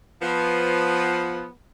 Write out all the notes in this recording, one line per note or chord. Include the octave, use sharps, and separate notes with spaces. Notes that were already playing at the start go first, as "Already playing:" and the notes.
F3 B3